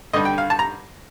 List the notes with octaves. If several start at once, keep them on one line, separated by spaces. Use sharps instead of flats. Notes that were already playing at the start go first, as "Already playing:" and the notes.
G2 D3 G3 D#5
G5
F5
A5
A#5